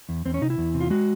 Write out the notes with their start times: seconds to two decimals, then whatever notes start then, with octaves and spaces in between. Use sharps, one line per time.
0.09 E2
0.25 E2 C4
0.34 C#4
0.42 C3 D#4
0.50 E4
0.58 E2
0.74 C3
0.80 F4
0.90 G#3 F#4